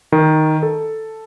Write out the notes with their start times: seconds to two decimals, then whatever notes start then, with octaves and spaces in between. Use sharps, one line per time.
0.12 D#3
0.63 A4